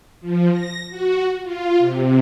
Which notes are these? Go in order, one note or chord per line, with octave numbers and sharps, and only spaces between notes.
F3
A#6
F#4
F4
C3